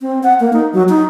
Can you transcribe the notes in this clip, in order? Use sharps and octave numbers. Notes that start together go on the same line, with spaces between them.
C4
F#5
A#3
D#4
F#3
D#4